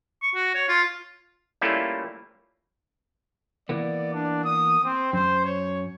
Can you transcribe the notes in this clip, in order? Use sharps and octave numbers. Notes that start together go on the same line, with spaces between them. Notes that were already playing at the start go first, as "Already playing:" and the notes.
C#6
F#4
C#5
F4
G3 A3 A#3 C#4 E4 F4
E3 A#3 B3 D5
D4
D#6
C4
F#2 C5
C#5